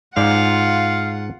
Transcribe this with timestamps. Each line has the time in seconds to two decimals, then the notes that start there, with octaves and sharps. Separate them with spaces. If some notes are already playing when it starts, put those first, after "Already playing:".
0.17 G#2 F4 D5 F5 F#5